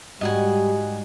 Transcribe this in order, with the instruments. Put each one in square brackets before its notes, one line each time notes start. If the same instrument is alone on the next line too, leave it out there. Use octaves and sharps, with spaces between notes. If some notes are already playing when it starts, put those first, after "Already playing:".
[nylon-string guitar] G#2 F#4 [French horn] G3 [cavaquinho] D#5 F#5 G#5